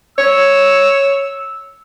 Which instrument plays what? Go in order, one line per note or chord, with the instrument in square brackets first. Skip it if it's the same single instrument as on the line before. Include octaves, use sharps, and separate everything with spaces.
[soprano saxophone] C#5 [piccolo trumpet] E6